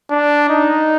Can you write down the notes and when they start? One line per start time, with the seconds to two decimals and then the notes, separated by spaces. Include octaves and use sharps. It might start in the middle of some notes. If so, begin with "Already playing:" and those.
0.11 D4
0.49 D#4